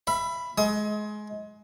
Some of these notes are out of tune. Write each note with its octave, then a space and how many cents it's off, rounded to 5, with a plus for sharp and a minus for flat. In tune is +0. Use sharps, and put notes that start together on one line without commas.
E5 +30 B5 +0
G#3 +25 D#6 +35